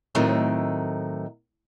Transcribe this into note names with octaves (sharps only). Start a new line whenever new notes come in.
A2 D#3 F#3 A3 C4 D#5